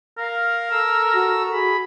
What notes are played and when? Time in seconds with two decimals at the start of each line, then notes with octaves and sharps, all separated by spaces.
0.18 A#4 F5
0.71 A4 A#5 E6
1.15 F#4
1.52 G#4 B5